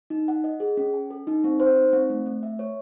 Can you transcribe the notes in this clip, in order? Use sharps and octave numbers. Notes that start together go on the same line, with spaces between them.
D#4
F#5
D#5
G#4
C#4
G#5
A4
D#4
C4
C5
D#4
C4
A3
A3
E5
C#5